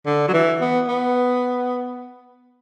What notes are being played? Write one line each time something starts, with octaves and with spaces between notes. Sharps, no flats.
D3
F#3
E3
B3
B3